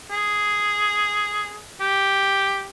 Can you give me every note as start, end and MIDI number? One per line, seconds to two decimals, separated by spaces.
0.11 1.57 68
1.81 2.66 67